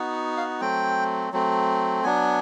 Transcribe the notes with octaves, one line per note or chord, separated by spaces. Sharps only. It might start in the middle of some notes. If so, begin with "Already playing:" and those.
Already playing: B3 D#4 F#4
F5
F#3 A3 C4 G5
F#3 A3 C4
F#3 B3 D4 G#5